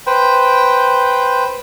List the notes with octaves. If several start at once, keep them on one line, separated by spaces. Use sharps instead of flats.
B4 C5 G5